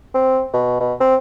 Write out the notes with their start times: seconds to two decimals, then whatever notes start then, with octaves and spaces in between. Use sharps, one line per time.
0.14 C4
0.53 B2
0.80 B2
1.00 C4